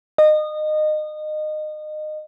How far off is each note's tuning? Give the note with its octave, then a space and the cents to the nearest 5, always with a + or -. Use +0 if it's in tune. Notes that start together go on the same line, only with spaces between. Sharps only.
D#5 -25